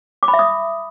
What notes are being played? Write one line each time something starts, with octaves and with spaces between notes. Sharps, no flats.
D6
B5
E5
D#6